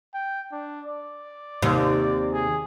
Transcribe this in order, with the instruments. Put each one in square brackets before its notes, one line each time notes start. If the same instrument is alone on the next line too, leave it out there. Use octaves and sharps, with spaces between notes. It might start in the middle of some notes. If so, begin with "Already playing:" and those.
[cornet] G5
D4
D5
[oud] D#2 C3
[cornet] G#4